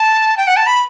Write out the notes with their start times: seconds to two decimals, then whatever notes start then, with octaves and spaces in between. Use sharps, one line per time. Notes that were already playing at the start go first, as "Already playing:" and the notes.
Already playing: A5
0.37 G5
0.47 F#5
0.56 A5
0.67 B5